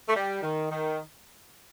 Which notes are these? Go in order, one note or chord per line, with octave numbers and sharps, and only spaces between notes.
A3
G3
D#3
D#3